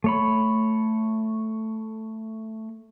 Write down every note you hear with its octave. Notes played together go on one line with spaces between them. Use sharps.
A3 C#5 B5